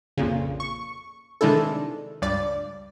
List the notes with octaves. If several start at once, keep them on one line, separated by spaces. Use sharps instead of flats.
A#1 F2 A#2 C#3
C#6
C3 D#3 G#3 D4 E4 A4
C#2 G2 D5